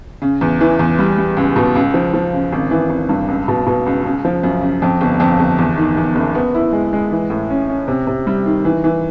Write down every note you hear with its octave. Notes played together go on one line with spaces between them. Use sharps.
C#3
E2
E3
E2
G3
G3
C#2
B2
C#2
F3
F3
C#3
G#1
E3
G#1
G2
C#2
B2
B2
C#2
C#3
F3
F#2
C#3
F2
G1
F2
G1
E2
D#3
E2
F#1
B3
E4
G#3
G#3
E3
A2
C#4
C#4
C3
C3
G3
D#3
E3
E3